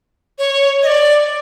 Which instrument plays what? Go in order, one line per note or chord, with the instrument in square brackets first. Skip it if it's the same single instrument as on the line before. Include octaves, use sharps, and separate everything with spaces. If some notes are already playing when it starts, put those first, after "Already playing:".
[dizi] C#5
D#5
D5